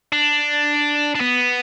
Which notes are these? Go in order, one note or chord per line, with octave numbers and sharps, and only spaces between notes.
D4
D4
B3